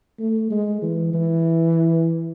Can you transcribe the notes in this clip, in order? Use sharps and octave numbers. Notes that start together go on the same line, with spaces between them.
A3
G#3
E3
E3